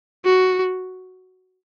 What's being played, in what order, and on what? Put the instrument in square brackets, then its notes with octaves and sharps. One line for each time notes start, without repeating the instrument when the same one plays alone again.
[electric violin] F#4